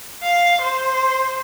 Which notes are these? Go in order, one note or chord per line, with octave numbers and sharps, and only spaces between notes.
F5
C5